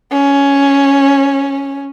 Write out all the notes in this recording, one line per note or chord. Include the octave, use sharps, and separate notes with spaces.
C#4